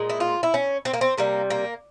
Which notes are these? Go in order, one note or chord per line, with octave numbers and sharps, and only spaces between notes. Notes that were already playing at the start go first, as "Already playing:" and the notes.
Already playing: A#2 G#3
E4
F4
E4
C#4
C4
A#3
C4
C3 G3 A#3
A#3